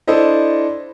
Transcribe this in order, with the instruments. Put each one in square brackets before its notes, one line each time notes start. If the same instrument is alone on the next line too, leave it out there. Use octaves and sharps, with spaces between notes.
[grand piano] D4 E4 A4 C5 D#5